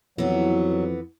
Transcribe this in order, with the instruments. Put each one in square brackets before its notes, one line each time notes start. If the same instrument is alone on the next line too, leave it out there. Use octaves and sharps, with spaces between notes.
[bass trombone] F2 [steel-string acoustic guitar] E3 B3 [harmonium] F#3